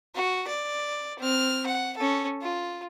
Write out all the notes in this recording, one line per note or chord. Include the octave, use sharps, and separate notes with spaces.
F#4
D5
C4 F6
F#5
C#4 A4
F4